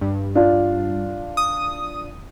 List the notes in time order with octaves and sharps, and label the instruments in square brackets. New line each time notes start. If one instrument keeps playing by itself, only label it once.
[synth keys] G2
[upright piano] D4 F4
[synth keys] D#6